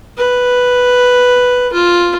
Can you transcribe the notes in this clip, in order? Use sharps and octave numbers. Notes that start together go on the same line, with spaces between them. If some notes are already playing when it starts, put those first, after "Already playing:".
B4
F4